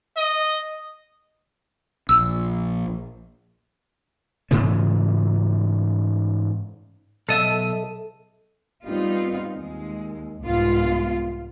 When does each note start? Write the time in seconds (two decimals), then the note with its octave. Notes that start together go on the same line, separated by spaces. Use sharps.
0.17 D#5
2.09 A#1 E6
4.51 G#2 C#3 E3 A3
7.29 B1 A4 D#5 E5
8.85 G3 B3 C4 D#4 F4
9.56 D#2 G#3
10.42 C2 G#2 B3 F4